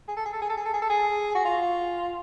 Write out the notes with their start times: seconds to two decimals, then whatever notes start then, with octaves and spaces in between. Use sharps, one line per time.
0.08 G#4
0.16 A4
0.25 G#4
0.33 A4
0.42 G#4
0.49 A4
0.57 G#4
0.65 A4
0.74 G#4
0.82 A4
0.90 G#4
1.35 F#4
1.45 F4